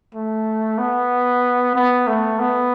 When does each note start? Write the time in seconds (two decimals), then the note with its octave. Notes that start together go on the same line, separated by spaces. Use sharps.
0.14 A3
0.78 B3
1.75 B3
2.07 A3
2.40 B3